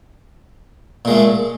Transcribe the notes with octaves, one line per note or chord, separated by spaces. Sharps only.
A#2 G#3 A3